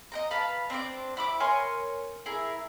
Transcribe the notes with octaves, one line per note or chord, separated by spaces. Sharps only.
D#5 G5 A#5
B4 F5 A5 B5
C4 D4 C5 D6
E4 B5 D6
A#4 C#5 G#5 C6
E4 G#4 A#4